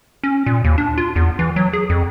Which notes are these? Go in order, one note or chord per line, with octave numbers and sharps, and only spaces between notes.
C#4
A#2
D#2
D4
F4
E2
E3
F#3
G#4
F2